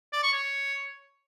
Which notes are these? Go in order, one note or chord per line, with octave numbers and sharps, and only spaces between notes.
D5
C#6
C#5